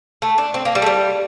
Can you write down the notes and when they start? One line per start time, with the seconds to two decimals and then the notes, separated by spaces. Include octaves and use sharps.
0.22 A3
0.38 D4
0.54 C4
0.65 A#3
0.75 G3
0.82 A3
0.86 G3